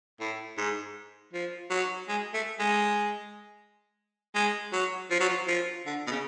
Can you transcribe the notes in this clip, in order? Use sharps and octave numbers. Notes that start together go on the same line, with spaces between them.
A2
G#2
F3
F#3
G#3
A3
G#3
G#3
F#3
F3
F#3
F3
F3
D3
B2
C#3